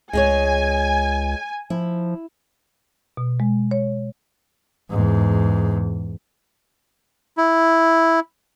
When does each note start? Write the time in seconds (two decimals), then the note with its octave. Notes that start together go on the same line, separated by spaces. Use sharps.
0.13 C#2 G#3 G#4 C#5 G#5
1.70 F3 E4
3.17 B2
3.40 G#3
3.71 C#5
4.90 E2 G#2
7.38 E4